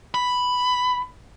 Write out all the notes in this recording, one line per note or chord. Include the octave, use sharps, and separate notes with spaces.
B5